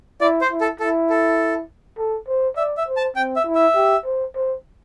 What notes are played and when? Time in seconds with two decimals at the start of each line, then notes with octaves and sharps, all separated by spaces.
0.21 E4 D5
0.41 C5
0.51 E4
0.61 A4
0.80 E4 A4
1.10 A4
1.98 A4
2.28 C5
2.57 D5 E5
2.77 E5
2.87 C5
2.97 A5
3.16 C4 G5
3.36 E5
3.46 E4
3.55 E5
3.75 G4
4.05 C5
4.35 C5